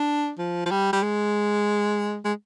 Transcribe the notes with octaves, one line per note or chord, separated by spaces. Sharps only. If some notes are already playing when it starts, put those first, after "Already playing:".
Already playing: D4
F3
F3
G3
G3
G#3
G#3